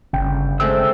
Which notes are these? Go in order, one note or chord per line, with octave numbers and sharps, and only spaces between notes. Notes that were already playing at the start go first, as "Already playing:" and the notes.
G1 C#3 G5
G#3 A3 C4 E6